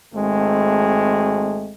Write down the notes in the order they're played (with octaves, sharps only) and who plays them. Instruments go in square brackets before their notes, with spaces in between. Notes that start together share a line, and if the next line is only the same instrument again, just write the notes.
[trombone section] G#1 G#3 A3 C4